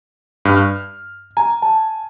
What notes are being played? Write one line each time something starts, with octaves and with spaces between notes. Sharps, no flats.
G2 F6
F6
G#5 A#5
A5